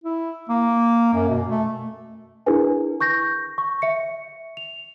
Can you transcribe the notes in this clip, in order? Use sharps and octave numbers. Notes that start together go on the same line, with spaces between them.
E4
A#3
F#2
B2
A3
D4 E4 G#4 A#4 B4 G#5
C#6 G6 A#6
C#6
E5 C#7
F7